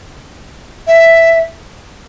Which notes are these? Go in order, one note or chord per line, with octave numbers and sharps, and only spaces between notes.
E5